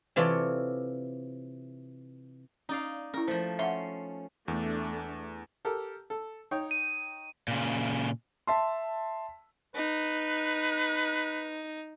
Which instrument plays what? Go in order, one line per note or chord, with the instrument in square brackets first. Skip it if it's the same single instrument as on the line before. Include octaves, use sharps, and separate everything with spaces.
[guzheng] C3 E3 F4 A4 C#5 D5
[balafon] C#4 [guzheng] D#4 D5 F5
[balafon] C#4 E4 [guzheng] A#4
[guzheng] F3 A3 [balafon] C5
[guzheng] C#4 C6 [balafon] E5 F#5
[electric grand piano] E2 [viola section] A3 D4
[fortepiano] G4 A4 A#4
A4
D#4 C#5 G5
[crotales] D#7
[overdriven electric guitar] A#2 C#3
[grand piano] E5 A5 C6
[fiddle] D#4 [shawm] B4